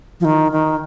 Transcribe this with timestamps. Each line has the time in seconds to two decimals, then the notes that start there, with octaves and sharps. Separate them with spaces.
0.20 F3
0.25 D#3
0.52 D#3